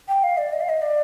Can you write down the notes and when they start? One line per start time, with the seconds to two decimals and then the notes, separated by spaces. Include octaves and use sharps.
0.08 G5
0.23 F5
0.38 D5
0.53 D#5
0.61 F5
0.69 D#5
0.82 D5